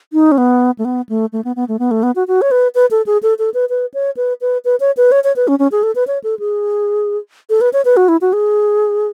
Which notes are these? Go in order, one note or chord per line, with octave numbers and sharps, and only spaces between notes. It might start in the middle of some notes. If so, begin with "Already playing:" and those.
D#4
C#4
B3
A3
B3
A3
A3
B3
B3
A3
B3
A3
B3
F#4
F#4
C#5
B4
B4
A4
G#4
A4
A4
B4
B4
C#5
B4
B4
B4
C#5
B4
C#5
C#5
B4
C#4
C#4
G#4
A4
B4
C#5
A4
G#4
A4
B4
C#5
B4
F#4
E4
F#4
G#4